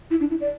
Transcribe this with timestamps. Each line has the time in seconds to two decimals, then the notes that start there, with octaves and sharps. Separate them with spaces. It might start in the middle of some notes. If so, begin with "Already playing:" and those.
0.11 E4
0.20 D4
0.30 E4
0.41 D5